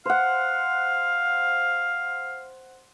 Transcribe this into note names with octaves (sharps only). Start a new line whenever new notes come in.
C5 F5 F#5